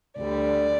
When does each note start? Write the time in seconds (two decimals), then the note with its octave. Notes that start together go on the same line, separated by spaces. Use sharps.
0.19 D2 D3 G3 D5